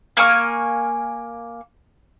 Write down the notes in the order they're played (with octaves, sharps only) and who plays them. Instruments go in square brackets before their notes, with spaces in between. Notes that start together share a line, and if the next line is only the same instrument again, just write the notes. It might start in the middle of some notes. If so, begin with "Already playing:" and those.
[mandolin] A#3 G#5 C#6 F6